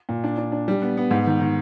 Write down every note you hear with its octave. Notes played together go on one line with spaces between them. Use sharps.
A#2
D4
D4
D4
G3
B3
B3
G#2
D#3
D#3